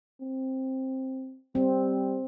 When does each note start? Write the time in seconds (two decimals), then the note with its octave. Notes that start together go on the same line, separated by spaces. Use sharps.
0.21 C4
1.55 G3 C4